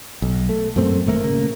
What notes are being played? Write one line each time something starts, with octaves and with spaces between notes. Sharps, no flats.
B1
A3
F#2 A#2 A3 C4
G#1 A#2 A3 A#3
C#3 A#3